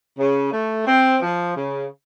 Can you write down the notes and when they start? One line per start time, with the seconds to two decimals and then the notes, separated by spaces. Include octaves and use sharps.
0.18 C#3
0.53 A3
0.87 C4
1.23 F3
1.57 C#3